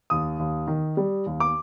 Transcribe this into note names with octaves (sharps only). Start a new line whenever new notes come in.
D#2 D#6
D#2
D#3
G3
D#2
D6